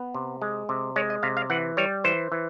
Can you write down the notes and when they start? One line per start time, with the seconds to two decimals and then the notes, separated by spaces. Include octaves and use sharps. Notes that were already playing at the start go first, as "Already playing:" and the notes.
Already playing: B3
0.15 C3
0.42 G#3
0.69 C3
0.96 G#3 C#5
1.10 D#5
1.23 C3 F5
1.37 F5
1.50 E3 F#5
1.77 G3 C#5
2.04 E3 C5
2.32 E3